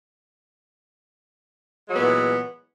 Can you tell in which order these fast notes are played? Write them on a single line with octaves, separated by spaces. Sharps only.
G#3 F#3 B3 A#2 E3